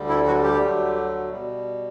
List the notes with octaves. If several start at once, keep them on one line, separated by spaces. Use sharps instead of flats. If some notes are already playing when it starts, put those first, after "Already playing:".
Already playing: D2 D3 G3
E4
F#3 F#4
G3 G4
D2 D3 F#3 A3
B2 G3